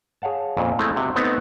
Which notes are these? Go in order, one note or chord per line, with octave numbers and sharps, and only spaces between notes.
G#4 C#5 F5 F#5 A5
F2 A#2 C#3
G#3 A3 C4 E4
C3 F#4 E5
A3 B3 C4 D#4 F#5